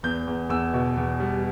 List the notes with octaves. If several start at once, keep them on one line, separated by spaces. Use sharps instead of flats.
E2 G6
E2
E2 E6
B2
E2
G3